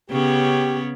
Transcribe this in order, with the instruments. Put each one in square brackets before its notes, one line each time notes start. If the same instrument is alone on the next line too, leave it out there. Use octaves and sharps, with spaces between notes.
[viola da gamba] C#3 B3 C#4 [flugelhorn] G4